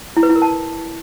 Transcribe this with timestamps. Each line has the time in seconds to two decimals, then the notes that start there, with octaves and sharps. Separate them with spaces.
0.17 E4
0.23 B4
0.29 E4
0.35 A#4
0.42 A5